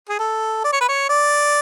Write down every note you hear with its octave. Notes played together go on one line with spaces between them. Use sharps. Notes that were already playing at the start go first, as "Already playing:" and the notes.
G#4
A4
D5
C#5
B4
C#5
D5